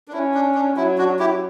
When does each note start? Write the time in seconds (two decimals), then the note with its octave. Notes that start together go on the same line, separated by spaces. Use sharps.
0.08 D4
0.13 C#4 E4
0.34 D4
0.55 D4
0.76 F#3 E4
0.98 D4 F#4
1.19 E4 G4